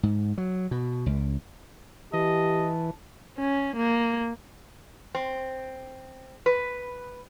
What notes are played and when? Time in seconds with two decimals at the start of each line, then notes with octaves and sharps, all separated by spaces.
0.03 G#2
0.38 F#3
0.71 B2
1.06 C#2
2.13 E3 G4 D#5 A5
3.38 C#4
3.76 A#3
5.15 C4
6.46 B4